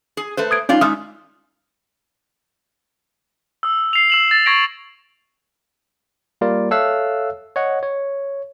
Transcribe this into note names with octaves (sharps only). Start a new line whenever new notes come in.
G#4
A3 B4 C5
D#6 G#6 D7
G2 C#4 D#4 F4 D5
G#3 D#4 E5 D#6 F6
D#6 E6
C7 F7
E6 E7 F#7
A6
C#6 G#6 A#6 C7 D7
G3 A#3 F4 A#4 D5
A4 C#5 E5 F5 E6 F#6
C#5 D#5 F#5
C#5